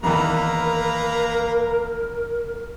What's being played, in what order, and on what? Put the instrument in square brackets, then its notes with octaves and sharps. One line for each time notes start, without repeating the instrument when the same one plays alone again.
[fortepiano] E2 D#3 E3 [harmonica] A#3 B4 A#5 [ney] A#4